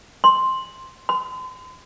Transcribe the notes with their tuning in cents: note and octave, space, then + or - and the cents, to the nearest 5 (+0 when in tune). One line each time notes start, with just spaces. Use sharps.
C6 +5
C6 -40